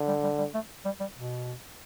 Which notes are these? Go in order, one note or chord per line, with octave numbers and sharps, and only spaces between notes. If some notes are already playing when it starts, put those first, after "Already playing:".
Already playing: D3
G3
G3
G3
A3
G3
G3
B2